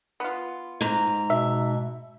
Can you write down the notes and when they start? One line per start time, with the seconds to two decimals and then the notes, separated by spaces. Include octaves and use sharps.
0.20 B3 F4
0.81 G#2 A#5
1.30 B2 E5